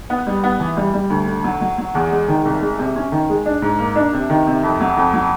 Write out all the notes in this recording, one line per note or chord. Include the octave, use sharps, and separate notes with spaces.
B3
G3
B3
E3
G3
G3
D2
D3
F#3
F#3
F#3
E2
G#3
D#3
C2
G#3
C3
C#4
D#3
G#3
D4
G#2
A#3
D4
C3
D#3
C3
F2
F#3
F2
F#3